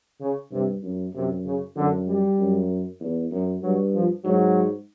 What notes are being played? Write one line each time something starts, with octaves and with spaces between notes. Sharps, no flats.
C#3
G2 C3
F#2
F#2 C3
C#3
F#2 D3
G3
F#2
E2
F#2
G2 F#3
F3
G#2 F#3